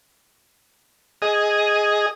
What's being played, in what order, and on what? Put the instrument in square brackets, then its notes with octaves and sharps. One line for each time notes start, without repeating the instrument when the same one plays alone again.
[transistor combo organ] G#4 D#5